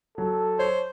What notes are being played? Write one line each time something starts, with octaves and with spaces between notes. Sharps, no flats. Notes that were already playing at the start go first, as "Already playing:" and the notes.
F#3 A4
C5 C#5